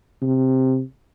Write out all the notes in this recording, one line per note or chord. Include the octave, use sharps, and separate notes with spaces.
C3